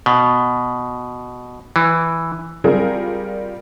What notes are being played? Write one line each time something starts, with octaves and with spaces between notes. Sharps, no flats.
B2
E3
G3 C4 F4 G#4 A#4